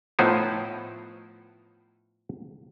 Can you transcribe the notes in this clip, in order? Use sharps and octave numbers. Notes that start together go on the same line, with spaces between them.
A2 F3 B3 D#4 E4 C5